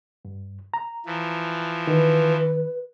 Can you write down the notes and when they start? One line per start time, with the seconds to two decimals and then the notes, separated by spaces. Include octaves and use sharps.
0.25 G2
0.74 A#5
1.06 E3 F3
1.87 D#3 B4